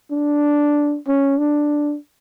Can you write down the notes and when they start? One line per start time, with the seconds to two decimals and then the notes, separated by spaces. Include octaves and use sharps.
0.12 D4
1.07 C#4
1.39 D4